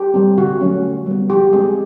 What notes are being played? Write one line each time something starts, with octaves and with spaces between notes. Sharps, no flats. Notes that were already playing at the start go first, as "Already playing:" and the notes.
Already playing: G4
G3 C4
D3 F#4
F#3 A3 C#4
D3
G3 B3
F3 G4
G#3 C4 G#4